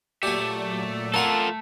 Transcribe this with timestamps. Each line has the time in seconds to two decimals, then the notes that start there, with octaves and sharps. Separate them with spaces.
0.23 A#2 F#3 A3 G4 D5 E5 G#5
1.14 F4 A4 A#4 F#5 G#5